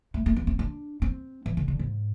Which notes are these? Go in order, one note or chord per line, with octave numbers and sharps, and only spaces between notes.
A3
A3
B3
C4
D4
C4
E3
D3
D3
G#2